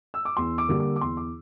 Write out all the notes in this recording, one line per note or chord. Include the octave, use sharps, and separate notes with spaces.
E6
D6
E2 C6
D6
D3 G3 A#3
D6
D6
E2 C6
D6